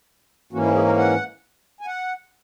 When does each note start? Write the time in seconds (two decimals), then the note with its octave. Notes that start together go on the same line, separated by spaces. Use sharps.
0.52 G#2 E3 A#3 C#4 F#4
0.64 E4
0.75 G#4
0.85 A#4
0.97 F#5
1.81 G#5
1.86 F#5